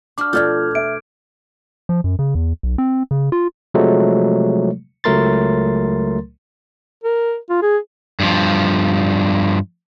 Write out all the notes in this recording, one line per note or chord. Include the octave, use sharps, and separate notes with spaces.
D4 F#4 G5 D6 F6
B2 F3 A3 A4 D5 F6 G6 G#6
E5 D7
F3
F#2
C#3
E2
B1
C4
C#3
F4
C3 F3 F#3 G#3 A3
C#2 F#3 A3 A#4 C6 A6
A#4
F4
G#4
G2 F3